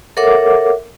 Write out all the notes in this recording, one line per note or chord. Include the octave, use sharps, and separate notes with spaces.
A4 A#4 C#5 E5 F#5 D6